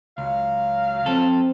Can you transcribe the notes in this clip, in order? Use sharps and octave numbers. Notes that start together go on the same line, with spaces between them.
C#2 F#3 F5
F3 C4 A4